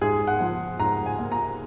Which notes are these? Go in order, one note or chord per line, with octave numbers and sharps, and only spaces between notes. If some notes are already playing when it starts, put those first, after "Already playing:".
G#2 G#4
F#5
F3
G#2 A#5
G#5
A#3
A#5